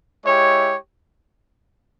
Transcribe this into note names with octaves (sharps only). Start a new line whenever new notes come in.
G#3 E4 G4 C#5